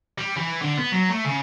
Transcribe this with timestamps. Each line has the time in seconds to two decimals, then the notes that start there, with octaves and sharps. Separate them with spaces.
0.18 G3
0.37 E3
0.62 D3
0.78 B3
0.92 F#3
1.09 A3
1.25 C#3